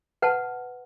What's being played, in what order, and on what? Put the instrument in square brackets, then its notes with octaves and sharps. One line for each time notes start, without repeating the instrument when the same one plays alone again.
[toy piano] B4 F#5 A5